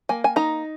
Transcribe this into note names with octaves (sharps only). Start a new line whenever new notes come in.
A#3 G#5
G#5
D#4 A#5